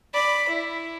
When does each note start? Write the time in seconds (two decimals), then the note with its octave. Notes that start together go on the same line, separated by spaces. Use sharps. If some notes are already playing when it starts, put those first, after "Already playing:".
0.14 D5 B5
0.49 E4